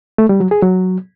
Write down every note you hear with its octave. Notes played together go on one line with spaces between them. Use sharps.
A3
G3
F#3
G#4
F#3